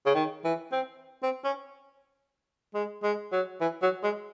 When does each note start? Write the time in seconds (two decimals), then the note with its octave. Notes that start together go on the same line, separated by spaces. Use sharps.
0.06 C#3
0.15 D#3
0.44 E3
0.72 C4
1.23 C4
1.44 C#4
2.74 G#3
3.03 G#3
3.32 F#3
3.61 E3
3.82 F#3
4.03 G#3